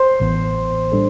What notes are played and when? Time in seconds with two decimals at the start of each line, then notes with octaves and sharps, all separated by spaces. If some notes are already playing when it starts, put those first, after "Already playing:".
Already playing: C5
0.20 A1 A2 E3 B3
0.92 A2 G3 D4 A4